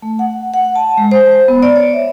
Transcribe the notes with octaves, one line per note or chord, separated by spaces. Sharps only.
A3
F#5
F#5
A5
G#3
C5
B3
D5
C#5
E5